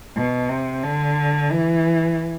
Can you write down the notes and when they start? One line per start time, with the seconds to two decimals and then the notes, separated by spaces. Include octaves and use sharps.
0.16 B2
0.50 C3
0.84 D3
1.52 E3